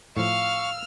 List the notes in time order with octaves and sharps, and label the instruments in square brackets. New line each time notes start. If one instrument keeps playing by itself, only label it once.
[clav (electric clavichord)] A2 F3 [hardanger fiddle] F5 [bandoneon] C#6 [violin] E6 F6